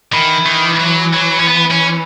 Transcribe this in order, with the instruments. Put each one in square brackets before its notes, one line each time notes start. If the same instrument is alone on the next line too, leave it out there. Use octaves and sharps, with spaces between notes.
[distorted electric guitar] D#3 [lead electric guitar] E3
[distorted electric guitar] D#3
F#3
F#3
C#4
B3
C#4